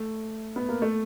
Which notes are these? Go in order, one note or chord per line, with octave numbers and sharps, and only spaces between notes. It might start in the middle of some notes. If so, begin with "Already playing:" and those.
Already playing: A3
B3
A#3
A3